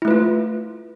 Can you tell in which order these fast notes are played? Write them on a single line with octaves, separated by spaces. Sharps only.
E4 A3 B4 F4